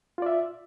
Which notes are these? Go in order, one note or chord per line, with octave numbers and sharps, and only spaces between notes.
F4 D5 E5